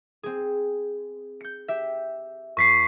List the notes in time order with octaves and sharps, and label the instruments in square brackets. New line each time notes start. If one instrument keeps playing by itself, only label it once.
[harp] C4 G#4
G6 C#7
G4 E5
[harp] E2 [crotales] C#6 B6 C7